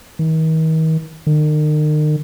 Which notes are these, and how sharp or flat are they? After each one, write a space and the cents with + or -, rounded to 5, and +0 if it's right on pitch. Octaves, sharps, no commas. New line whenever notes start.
D#3 +40
D#3 -40